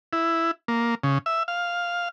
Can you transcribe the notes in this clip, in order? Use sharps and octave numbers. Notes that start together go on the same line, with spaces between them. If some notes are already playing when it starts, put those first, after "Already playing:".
E4
A#3
C#3
E5
F5